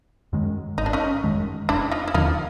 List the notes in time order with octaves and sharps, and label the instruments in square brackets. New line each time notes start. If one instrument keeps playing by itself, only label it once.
[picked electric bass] F#2 D#3 G#3
[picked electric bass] G#1 [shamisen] D#4
[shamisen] D4
C#4 D#4
[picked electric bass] F#2 D#3 G#3
[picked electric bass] F1 [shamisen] D4 E4
[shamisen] D#4 F4
E4
[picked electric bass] D#2 D3 F3 [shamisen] D#4 F4